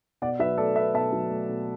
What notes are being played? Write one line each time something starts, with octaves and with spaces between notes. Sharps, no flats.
B2 D5 F#5
F#3 B4 E5
A3 A4 D5
B2 B4 E5
B2 E5 A5
F#3
A3
B2